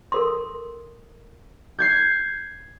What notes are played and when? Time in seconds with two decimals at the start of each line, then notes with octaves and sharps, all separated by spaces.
0.12 A4 A#4 C6
1.79 G6 G#6 C7